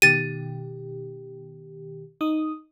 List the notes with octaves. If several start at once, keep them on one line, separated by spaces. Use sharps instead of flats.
B2 D#3 G4 A6 D#7
D#4 D#6